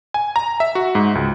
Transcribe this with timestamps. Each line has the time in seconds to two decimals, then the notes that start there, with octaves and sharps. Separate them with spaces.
0.14 G#5
0.36 A#5
0.60 E5
0.75 F#4
0.95 G#2
1.15 C#2